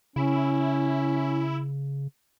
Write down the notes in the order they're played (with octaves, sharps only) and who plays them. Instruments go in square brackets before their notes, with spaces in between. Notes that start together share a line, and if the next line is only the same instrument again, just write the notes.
[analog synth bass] C#3 [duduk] C#4 [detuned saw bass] E4